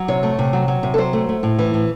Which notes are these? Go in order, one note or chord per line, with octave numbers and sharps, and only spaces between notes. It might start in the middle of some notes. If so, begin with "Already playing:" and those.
Already playing: F#3
C3 C#5
A3
C3
F#3
F#3
C3
A4
F#3 C5
A3
A3
A2
E3
A2